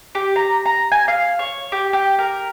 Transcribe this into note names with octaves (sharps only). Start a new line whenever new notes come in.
G4
A#5
A#5
G#5
F5
C#5
G4
G4
A#4